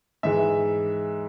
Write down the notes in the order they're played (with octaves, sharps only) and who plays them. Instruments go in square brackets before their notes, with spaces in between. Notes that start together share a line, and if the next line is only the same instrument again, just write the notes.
[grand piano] G#2 E3 G#3 E5